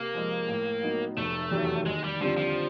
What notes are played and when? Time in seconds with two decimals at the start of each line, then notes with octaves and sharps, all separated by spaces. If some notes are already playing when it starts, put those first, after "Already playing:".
Already playing: C3 A#3
0.15 F3 G#3
0.48 A2
0.83 F#3 B3 D#4
1.17 F1 A3
1.51 E2 C3 D#3 F#3
1.86 D#2 G#3
2.04 G3
2.21 D3 F3 G3 C4
2.37 F3